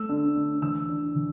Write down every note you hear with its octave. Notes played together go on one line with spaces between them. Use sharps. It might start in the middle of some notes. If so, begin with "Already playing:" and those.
Already playing: A3 E6
D3
D3
E3 E6
D4
E3